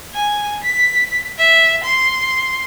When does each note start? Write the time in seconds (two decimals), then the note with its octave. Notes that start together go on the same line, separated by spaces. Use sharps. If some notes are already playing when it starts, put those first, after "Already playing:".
0.14 G#5
0.64 B6
1.38 E5
1.83 C6